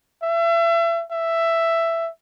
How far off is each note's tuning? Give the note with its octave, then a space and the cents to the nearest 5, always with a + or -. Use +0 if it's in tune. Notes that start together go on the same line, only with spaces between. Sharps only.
E5 +35
E5 +10